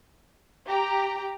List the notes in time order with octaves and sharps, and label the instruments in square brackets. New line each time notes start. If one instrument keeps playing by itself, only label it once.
[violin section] G4 A#5